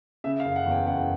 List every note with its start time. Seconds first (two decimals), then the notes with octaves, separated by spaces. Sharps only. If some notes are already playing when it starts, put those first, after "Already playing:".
0.24 C#3 E5
0.40 F5
0.45 F#1
0.56 F#5
0.66 E2
0.71 G5
0.87 F#1 F#5